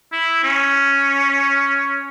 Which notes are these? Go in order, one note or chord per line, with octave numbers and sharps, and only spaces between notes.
E4
C#4